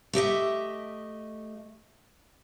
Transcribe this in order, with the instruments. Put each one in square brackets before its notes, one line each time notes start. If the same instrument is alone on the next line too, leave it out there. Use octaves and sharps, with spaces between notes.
[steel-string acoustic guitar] A3 G4 D#5 E5